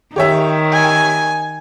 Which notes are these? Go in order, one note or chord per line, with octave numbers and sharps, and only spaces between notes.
D#3 G4 C#5 E5
G#5